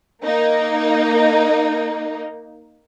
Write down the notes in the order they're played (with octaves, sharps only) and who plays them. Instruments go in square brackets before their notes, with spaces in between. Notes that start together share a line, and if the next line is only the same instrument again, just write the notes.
[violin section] A#3 D#4